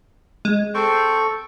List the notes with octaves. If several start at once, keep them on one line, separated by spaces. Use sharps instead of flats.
G#3
C4 A4 C#6